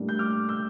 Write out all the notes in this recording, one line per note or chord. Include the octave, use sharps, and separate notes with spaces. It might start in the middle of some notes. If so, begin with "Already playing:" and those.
Already playing: A2 G3 A#3 D4
G6
D6 F6
E6 G6